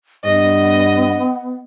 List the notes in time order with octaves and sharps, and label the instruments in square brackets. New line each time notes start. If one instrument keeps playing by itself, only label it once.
[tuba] G2 [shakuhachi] B3 [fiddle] D#5